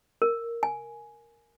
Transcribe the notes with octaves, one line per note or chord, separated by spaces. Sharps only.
A#4
G#5